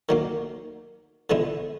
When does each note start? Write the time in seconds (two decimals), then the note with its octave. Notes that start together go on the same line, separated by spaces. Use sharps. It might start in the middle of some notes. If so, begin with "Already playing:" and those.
0.09 D#3 F#3 A#3
1.30 D3 F3 G#3 B3 E4